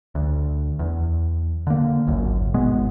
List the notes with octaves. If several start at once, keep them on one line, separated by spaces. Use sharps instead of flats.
D2
E2
D3 A#3
G#1 C#2 F#2
G#1 B2 G#3 B3